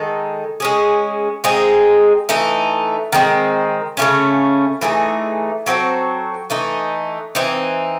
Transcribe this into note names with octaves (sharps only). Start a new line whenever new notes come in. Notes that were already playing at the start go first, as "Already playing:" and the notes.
Already playing: D#3 G#3 D#4 A4
G#3 C#4 G#4
G#3 C4 D#4 G#4
E3 A3 D#4
D#3 G#3 C4
C#3 E3 A3 C#4
E3 A3 D#4 G#4
F#3 C4 F#4 A4
E3 A3 D#4
E3 C4 D#4